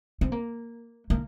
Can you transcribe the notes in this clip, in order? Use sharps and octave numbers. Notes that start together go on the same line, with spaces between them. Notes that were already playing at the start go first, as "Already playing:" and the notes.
C4
A#3
A#3